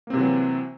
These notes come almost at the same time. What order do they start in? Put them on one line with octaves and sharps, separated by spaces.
A#3 C4 C3 E3 F#3